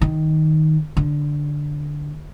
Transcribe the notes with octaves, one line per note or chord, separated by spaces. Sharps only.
D#3
D3